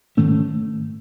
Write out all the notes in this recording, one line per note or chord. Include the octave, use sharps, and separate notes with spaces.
G#2 D#3 A3 C#4